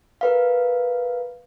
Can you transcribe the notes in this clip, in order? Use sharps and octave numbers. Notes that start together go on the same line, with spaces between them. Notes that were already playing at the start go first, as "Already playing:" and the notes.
A#4 B4 F5